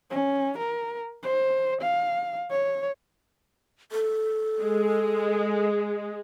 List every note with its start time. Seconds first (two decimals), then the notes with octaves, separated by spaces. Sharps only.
0.10 C#4
0.58 A#4
1.23 C5
1.82 F5
2.51 C#5
3.92 A4
4.60 G#3